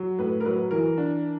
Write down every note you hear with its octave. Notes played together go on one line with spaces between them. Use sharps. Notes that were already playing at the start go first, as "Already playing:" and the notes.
Already playing: F#3
A2 B4
A#4
F#3 B4
E3 A#4
D4